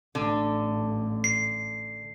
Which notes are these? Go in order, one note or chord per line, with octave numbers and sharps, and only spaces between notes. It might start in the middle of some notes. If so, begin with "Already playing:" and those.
A1 D3
C7